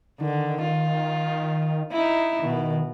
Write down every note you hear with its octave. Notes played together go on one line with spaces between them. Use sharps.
D3 D#3
F4
D#4 E4
B2 D#3